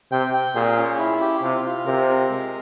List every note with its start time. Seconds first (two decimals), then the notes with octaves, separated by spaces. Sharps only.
0.12 C3 G5
0.34 G5
0.55 A#2 G#4
0.77 C#4
0.99 E4
1.21 G4
1.42 C3 F4
1.65 F4
1.86 C3 A#4
2.08 A#4
2.30 G#3